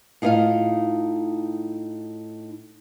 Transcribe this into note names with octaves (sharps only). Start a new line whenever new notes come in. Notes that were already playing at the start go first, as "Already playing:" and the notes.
A2 D#4 F4 C5 D#5 F5